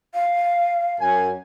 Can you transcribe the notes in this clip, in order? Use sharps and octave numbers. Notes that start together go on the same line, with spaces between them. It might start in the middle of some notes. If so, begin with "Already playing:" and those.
F5
F#2 G#5